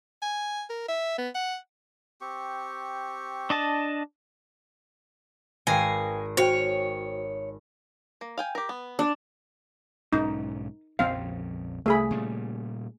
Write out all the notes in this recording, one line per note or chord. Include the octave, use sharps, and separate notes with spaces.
G#5
A#4
E5
B3
F#5
C4 G4 C#6
D4 D#5 A5
G#1 B4 F5 G5 G#5 A#6 C7
F#4 A#4 C5 C#5 G5
A#3
F5 G5 G#5
G4 A#4
B3
D4
B1 G#2 C#4 D#4
A#1 F2 C#3 C4 F5
C2 A3 G#4 B5
A#2 C#3 G3